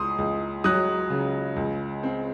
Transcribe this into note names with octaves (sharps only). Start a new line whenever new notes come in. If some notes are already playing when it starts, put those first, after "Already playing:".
Already playing: C#2 C6 D#6
C#2
F#3 D#6 F#6
C#3
C#2
C4